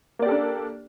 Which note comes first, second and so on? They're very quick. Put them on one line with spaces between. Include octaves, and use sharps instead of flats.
A#3 D5 G4 A4 D4